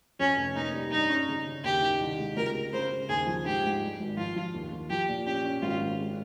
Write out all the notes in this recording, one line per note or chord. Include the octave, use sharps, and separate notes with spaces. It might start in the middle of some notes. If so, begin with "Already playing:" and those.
F2 C#4
F1
A#3 D#4
G3
G2 D#4
C#4
C#3
C#3
D#2 G4
D#3
C2
G#3
C#2 A#4
G#3
C#3 C5
C#3
D#2 G#4
F3
G#2 G4
G#2
G3
G#1
F3 F4
F3
D#2
D#2
F3 G4
A#2
C#4 G4
C#4
G#1 F4
G#1
G#3